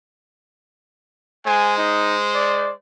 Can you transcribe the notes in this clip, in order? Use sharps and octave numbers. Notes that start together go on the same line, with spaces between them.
G#3 C5 G#5
D#4
D5